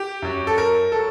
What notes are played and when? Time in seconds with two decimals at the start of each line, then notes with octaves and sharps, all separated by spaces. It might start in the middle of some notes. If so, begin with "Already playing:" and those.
Already playing: G4
0.22 F#2 F#3
0.47 A4
0.58 A#4
0.92 F#3 A4